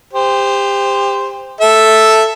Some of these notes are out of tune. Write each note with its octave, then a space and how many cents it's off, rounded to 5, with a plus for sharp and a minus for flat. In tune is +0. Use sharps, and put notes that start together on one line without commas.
G4 +30 C5 -10
A4 +0 E5 +0